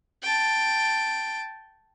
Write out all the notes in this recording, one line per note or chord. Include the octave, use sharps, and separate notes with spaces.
G5 A5